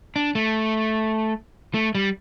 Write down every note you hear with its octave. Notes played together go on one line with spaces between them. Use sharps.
D4
A3
A3
G3